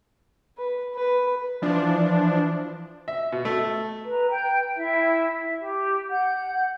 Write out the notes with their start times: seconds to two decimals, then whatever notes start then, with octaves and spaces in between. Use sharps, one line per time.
0.57 B4
0.94 B4
1.62 E3 F3 D4
3.08 E5
3.32 B2
3.45 A3
4.05 B4 A#5
4.31 G5 G6
4.76 E4 E5
5.37 E5
5.57 G4
6.10 F#5 G6